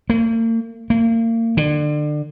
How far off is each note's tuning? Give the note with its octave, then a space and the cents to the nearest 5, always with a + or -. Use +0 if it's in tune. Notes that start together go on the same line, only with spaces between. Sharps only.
A#3 -45
A#3 -35
D3 +30